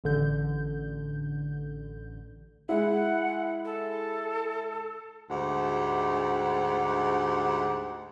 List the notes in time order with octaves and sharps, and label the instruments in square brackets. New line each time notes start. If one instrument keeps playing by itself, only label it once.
[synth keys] A1 D3 G6
[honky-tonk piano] G#3 E4 [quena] F#5
[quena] A4
[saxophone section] D2 G#2 G4 F#5